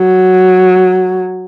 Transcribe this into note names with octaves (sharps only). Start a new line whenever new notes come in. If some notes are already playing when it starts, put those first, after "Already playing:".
Already playing: F#3